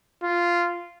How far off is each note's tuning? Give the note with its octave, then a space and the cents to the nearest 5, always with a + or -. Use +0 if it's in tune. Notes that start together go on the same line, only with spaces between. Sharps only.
F4 -10